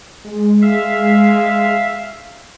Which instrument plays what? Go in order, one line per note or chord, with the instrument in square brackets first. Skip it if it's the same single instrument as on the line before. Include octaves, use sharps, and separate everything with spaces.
[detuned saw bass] G#3
[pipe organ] E5 F5